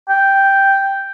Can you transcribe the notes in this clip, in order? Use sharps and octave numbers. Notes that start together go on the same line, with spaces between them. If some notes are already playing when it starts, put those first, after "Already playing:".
G5